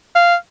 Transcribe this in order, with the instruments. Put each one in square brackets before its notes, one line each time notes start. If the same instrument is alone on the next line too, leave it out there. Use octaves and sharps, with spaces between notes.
[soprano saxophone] F5